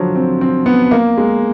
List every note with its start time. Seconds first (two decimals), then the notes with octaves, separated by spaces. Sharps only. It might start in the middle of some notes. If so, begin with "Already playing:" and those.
Already playing: D3 F3 F#3
0.15 C4
0.41 C4
0.66 B3
0.91 A#3
1.18 G#3